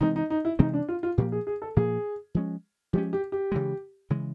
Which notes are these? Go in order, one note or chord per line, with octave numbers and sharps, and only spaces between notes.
C3 E3 G#3 C4 D#4
D#4
D#4
E4
C3 E3 G#3 C4 D#4
D4
F4
F4
A#2 F3 A#3 G4
G#4
G#4
A4
A#2 F3 A#3 G#4
F3 G#3 C#4
F3 G#3 C#4 G4
G4
G4
C#3 E3 G#3
C#3 E3 G#3